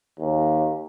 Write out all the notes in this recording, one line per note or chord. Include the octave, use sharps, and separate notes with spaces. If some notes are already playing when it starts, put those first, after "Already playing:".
D#2